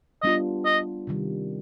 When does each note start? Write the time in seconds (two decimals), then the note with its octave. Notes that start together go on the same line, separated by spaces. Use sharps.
0.22 G3 B3 D4 F4 D#5
0.65 D#5
1.07 C3 D#3 G3